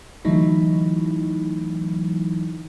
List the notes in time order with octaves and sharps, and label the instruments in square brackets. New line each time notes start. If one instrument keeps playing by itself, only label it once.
[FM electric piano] D3 E3 F#3 A3 D#4 E4